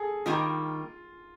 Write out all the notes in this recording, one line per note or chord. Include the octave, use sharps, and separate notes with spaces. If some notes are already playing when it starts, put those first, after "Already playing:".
Already playing: G#4 A4
D#3 G3 A#3 F4